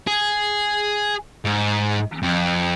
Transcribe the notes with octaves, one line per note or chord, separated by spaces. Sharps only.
G#4
G#2
F2